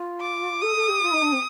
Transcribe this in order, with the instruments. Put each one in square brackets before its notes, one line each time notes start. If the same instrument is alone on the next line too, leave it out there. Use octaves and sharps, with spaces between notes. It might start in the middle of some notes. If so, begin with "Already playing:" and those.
Already playing: [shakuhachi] F4
[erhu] D6
[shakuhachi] A4 [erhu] D#6
[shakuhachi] A4
G4
F4
D#4
D4
C4